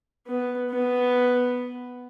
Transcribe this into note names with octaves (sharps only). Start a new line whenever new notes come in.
B3
B3